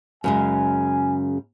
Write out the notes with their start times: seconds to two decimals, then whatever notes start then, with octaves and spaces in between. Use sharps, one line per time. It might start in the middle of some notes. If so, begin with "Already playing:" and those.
0.24 F#2 C#3 G#3 G#5